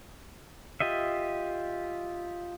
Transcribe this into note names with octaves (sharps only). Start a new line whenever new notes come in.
F4 G4 D#5 E5